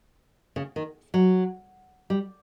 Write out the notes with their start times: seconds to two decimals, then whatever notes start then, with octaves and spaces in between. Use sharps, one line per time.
0.56 C#3
0.76 D#3
1.14 F#3
2.10 G3